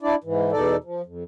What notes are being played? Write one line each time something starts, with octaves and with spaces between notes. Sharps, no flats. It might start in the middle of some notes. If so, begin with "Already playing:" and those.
D4 E4 D5
G#2 E3
E2 B2 D#4 A4 D5
F3
F2